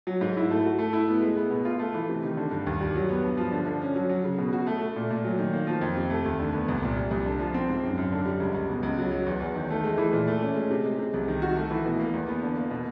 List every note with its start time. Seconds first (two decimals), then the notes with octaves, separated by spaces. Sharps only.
0.07 F#3
0.21 G#2
0.37 E4
0.50 A3
0.65 F#4
0.79 A3
0.93 E4
1.08 B3
1.22 G#3
1.36 B3
1.51 B2
1.65 F4
1.79 A3
1.94 E3
2.09 C3
2.23 D#3
2.37 D3
2.51 G2
2.67 D#2
2.81 G3
2.95 F#3
3.09 B3
3.23 G2
3.37 F3
3.52 D3
3.67 D3
3.81 C#4
3.95 F#3
4.09 F#3
4.24 C#3
4.38 B2
4.53 F#4
4.67 A3
4.81 A3
4.96 A#2
5.10 A#2
5.24 F#3
5.39 D#3
5.53 A#3
5.67 F3
5.81 F2
5.97 C3
6.10 A3
6.25 D#2
6.39 D3
6.53 B3
6.68 C2
6.83 A#2
6.96 G3
7.11 C2
7.26 D3
7.39 F3
7.54 C4
7.69 G#2
7.83 F#2
7.98 F#2
8.12 D3
8.25 G3
8.40 C#2
8.54 C#2
8.69 B2
8.83 C#2
8.98 F#3
9.12 F#3
9.26 E2
9.40 E2
9.55 D#3
9.70 A3
9.84 G#3
9.98 E3
10.13 A#2
10.28 A3
10.41 C#4
10.56 G#3
10.70 C3
10.85 G#3
10.99 C3
11.14 C2
11.28 D#3
11.42 F#4
11.57 A3
11.71 E3
11.86 B2
11.99 A#3
12.13 E2
12.29 B3
12.42 D3
12.56 A#3
12.70 B2